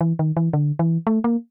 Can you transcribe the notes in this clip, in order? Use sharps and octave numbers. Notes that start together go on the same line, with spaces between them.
E3
D#3
E3
D3
E3
A3
A#3